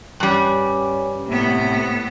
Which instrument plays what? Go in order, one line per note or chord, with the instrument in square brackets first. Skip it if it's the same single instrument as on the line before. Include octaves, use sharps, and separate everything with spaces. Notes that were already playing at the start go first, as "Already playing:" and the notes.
[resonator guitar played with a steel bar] G2 G3 [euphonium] C#4
[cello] A2 B3 [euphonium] C3